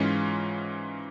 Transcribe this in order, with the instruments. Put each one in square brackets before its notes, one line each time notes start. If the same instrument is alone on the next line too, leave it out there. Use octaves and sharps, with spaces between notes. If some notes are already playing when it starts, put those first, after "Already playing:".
Already playing: [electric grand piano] G#2 E3 G#3 C#4 F4